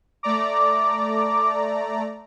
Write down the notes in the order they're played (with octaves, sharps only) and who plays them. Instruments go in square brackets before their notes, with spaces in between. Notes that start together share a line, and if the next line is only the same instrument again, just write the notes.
[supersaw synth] A3 D5 A#5 [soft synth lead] D6